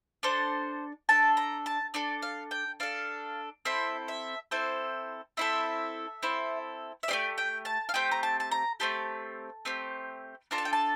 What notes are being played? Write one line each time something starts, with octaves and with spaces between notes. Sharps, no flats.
D4 A4 C5
D4 A4 A5
A#5
A5
D4 A4 D5
F5
G5
D4 A4 F5
C4 E4 A4 E5
E5
C4 E4 A4 C5
C4 E4 A4 E5
C4 E4 A4
E5
A3 C4 G4 D5
G5
A5
F5
A3 C4 G4 G5
A#5
A5
A5
A#5
A3 C4 G4 A5
A3 C4 G4
D4 F4 A4 A#5
A5
G5
A5